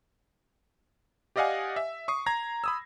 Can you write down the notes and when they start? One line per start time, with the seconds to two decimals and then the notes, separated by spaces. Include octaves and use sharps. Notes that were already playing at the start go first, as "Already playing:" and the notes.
1.36 G4 D5 D#5 F5 F#5 G#5
1.76 E5
2.08 C#6 D#6 C7
2.26 A#5 G#6 A#6
2.64 B5 D#6 E6